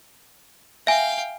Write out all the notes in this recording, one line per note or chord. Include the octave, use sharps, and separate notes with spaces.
E5 F5 G5 G#5